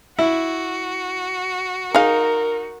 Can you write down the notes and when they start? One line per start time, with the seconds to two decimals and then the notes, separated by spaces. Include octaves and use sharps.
0.19 E4 F#4
1.95 D#4 G#4 A#4 F5